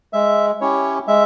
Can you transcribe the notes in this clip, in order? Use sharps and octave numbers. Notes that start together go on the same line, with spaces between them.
G#3 E5
C#4 E4 G4 C#5
G#3 E5